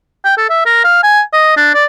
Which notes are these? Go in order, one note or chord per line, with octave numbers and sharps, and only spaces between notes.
G5
A4
E5
A#4
F5
G#5
D#5
D4
D5